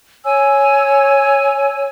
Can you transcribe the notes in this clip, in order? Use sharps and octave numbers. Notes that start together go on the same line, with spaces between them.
C#5 G#5 E6